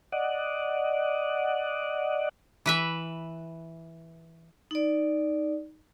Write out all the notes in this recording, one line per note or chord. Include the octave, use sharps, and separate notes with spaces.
D5 D#5 F#5
E3 B4 E5
D#4 D5